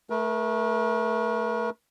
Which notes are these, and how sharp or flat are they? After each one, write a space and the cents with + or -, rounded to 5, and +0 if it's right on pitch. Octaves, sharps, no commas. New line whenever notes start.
A3 +0 A#4 +45